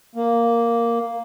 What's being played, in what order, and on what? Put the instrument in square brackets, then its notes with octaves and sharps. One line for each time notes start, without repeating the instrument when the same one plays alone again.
[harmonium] A#3